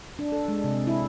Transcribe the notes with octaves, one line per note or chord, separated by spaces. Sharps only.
D4
A4
G#3
C3
E4